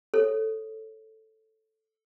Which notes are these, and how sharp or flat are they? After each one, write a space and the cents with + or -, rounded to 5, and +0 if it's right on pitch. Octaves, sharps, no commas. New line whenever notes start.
A4 +0 C#5 -20